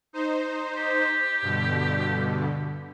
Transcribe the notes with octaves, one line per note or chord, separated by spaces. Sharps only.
D#4 C5
G4
G2 B2 D3